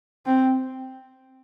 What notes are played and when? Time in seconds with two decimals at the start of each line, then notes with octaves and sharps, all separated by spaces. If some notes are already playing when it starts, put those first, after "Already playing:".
0.26 C4